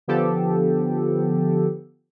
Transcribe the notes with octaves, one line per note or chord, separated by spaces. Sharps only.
D3 F3 B3 G4 A4